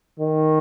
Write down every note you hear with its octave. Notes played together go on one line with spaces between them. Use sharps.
D#3